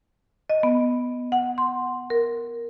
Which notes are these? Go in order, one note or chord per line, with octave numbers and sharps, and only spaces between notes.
D#5
B3
F#5
C6
A#4